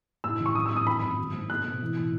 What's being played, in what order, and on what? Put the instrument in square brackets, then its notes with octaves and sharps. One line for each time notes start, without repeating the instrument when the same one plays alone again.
[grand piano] A2 [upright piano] E6
[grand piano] A1
[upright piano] C#6
[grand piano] F#2 [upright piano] D#6
[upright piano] E6
[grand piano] G#1
[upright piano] D#6
[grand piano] F#2 [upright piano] B5
[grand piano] G#1 [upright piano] D#6
[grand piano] F#3
G#2
[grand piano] A3 [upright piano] F#6
[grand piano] B2
E3
A2